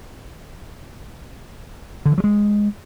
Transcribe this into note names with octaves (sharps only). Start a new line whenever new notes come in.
D3
E3
F#3
G#3